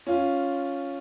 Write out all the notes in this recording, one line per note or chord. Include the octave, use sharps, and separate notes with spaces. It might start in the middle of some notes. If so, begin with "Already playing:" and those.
C#4 F4